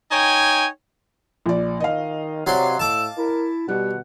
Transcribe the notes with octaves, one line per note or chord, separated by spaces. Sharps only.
D#4 C#5 G5 G#5
A#1 D5
D#3 D#5 F5
C3 F#3 C#5 D5 C6
A2 A5 D6 E6
E4 A#4
B2 G3 F#5